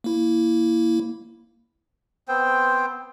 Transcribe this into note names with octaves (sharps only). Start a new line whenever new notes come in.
A#3 E4
B3 C4 C5 G5